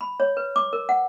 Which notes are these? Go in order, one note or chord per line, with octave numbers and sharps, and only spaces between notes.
B5
C#5
B4
D6
A#4
F#5